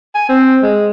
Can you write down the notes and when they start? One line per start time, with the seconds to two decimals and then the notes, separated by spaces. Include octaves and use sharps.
0.15 G#5
0.29 C4
0.63 G#3